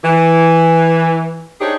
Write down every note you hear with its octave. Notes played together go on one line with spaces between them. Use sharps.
E3
D4 D#4 G4 G#4 C5 C#5